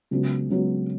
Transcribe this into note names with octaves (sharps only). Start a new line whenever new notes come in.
C#2 C#3 F#3 B3
C#2 C#3 F#3 B3